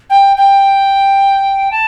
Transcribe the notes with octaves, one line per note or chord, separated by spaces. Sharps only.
G5
G5
A5